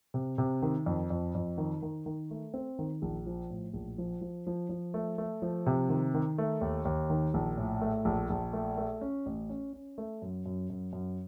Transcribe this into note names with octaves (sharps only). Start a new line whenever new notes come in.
C3
C3
D#3
F2
F2
F2
D#3
D#3
D#3
A3
C4
D#3
A#1
F3
A2
A#1
F3
F3
F3
F3
A3
A3
F3
C3
D#3
D#3
A3
D#2
D#2
D#3
A#1
A2
A3
A#1
A#1
A3
A3
C#4
A1
C#4
C#4
A3
F#2
F#2
F#2
F#2